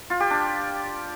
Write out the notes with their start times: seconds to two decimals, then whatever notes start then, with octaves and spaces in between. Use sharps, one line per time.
0.10 F4
0.20 G4
0.31 D4